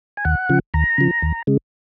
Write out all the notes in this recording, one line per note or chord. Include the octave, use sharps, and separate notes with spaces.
G#5
D#2 F#5
C#3 F3
D#2 A#5
C#3 F3
D#2
C#3 G#3